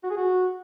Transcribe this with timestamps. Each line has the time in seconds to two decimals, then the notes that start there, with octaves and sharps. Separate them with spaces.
0.04 F#4
0.10 G#4
0.17 F#4